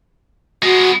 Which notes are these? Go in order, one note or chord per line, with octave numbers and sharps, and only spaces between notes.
G#3 B3 F#4